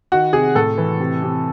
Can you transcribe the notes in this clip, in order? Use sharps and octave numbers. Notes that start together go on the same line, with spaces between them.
D#3 F#4
C3 G#4
A2 A4
E3
C3
C3